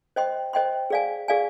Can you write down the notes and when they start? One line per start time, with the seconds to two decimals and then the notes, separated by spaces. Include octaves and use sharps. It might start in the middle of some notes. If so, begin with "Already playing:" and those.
0.16 C5 D#5 G5 C6
0.53 C5 D#5 G5 C6
0.90 G#4 D5 F5 G#5
1.28 G#4 D5 F5 G#5